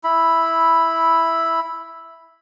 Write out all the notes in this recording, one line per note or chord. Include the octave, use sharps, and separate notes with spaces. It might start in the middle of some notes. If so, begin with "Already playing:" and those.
E4 B5